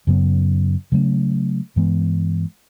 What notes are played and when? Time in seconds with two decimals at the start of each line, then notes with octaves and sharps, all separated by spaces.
0.07 F#2 C#3 F#3 B3
0.92 C#3 F#3 A3 C#4
1.76 G2 E3 G#3 B3